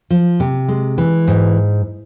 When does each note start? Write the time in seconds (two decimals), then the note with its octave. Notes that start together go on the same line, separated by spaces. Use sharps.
0.10 F3
0.40 C3
0.68 G#3
0.98 E3
1.28 G#2